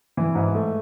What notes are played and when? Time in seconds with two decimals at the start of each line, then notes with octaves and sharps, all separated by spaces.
0.17 E3
0.35 G#2
0.54 A3